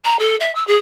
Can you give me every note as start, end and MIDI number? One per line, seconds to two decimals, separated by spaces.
0.04 0.19 82
0.19 0.36 69
0.40 0.54 76
0.55 0.65 88
0.67 0.76 68